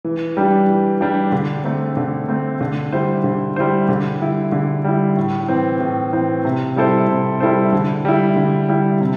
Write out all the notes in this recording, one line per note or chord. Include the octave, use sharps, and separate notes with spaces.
E3
G3 D4 G4
E3
G3 D4 G4
D3
A3 C4
D3
A3 C4
D3
G3 E4 C5
D3
G3 E4 C5
D3
G3 E4
D3
G3 E4
A2
E3 C4
A2
E3 C4
C3
G3 E4 A4 C5
C3
G3 E4 A4 C5
D3
G3 E4
D3
G3 E4
C3